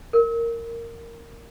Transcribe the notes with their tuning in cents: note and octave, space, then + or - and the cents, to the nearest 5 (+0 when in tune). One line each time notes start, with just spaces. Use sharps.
A#4 -10